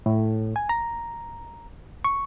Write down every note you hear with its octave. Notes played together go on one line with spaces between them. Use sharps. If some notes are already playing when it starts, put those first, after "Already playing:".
A2
G#5
A#5
C#6